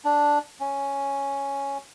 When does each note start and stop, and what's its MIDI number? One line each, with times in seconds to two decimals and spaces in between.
0.05 0.39 62
0.61 1.78 61